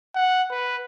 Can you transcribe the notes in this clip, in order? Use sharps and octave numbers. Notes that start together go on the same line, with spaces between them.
F#5
B4